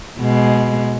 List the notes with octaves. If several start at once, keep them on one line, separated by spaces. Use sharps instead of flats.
B2 G#3